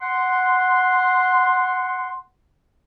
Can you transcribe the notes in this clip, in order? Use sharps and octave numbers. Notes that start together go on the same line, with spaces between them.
F#5 C6